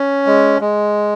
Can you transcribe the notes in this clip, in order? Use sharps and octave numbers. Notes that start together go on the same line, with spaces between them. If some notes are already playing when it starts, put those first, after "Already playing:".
Already playing: C#4
G#3
G#3